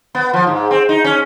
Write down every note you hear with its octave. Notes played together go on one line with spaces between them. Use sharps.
B3
F3
G#2
C4
D#4
C#4